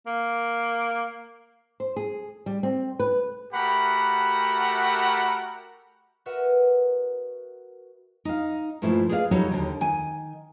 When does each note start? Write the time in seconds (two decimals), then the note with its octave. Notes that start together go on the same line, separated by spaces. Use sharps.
0.07 A#3
1.80 C5
1.96 G#4
2.46 G3
2.63 C4
3.00 B4
3.53 A3 F#4 G4 A#4 F#5 B5
6.26 F#4 A#4 B4 E5 F#5 D#6
8.25 D#4 F5
8.82 G2 A#2 F3 A3 E4
9.09 G#4 B4 D5 E5 F5
9.31 F#3 G3 D#4 F#4 A4 C#5
9.51 D#2 D3
9.81 D#3 G#5